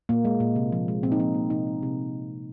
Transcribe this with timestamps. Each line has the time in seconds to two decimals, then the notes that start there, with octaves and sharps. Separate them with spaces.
0.09 A#2 A#3
0.25 G#3
0.40 A#2
0.56 C3
0.72 F3
0.88 G#3
1.03 A#2 C4
1.12 D#4
1.19 F3 C4
1.34 A#3
1.50 C3 D#4
1.66 G#3
1.83 C3